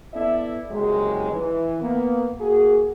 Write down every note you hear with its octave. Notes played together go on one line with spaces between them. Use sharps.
B3 E4 A4 D5 E5
F#1 C2 C3 F#3 G#3
E3
A#3 B3
A#3 F#4 G#4